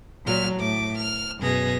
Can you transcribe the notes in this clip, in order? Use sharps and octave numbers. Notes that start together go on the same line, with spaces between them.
A#2 F#3 F6
A2 D6
F6
F#2 B2 B3 G#4 A#6